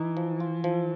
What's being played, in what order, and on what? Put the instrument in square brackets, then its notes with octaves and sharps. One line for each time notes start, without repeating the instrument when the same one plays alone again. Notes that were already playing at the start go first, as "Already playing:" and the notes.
Already playing: [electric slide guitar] E3 [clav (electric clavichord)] D#4
[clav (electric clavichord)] F3
F4
F3